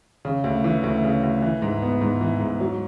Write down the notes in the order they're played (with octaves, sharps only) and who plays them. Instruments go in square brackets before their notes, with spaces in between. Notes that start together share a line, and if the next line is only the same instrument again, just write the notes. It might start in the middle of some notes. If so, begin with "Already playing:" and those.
[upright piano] C#3
D2
E3
D2
C#3
D2
E3
G#2
B3
G#2
E3
G#2
F#3